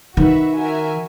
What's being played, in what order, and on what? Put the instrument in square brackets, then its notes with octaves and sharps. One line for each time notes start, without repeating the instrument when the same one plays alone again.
[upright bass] D#3 [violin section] F#4 B4 E5
[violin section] F#4 A#4 E5 G#5